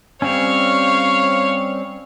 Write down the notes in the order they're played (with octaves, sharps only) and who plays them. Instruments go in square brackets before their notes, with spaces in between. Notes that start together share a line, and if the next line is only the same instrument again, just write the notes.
[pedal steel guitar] G3 C4 C#4 [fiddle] C#5 F5